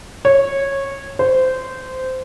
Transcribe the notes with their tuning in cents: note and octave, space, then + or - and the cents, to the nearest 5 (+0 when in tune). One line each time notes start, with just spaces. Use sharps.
C#5 -15
C5 -15